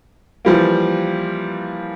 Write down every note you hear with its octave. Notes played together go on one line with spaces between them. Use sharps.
E3 F3 G3 A#3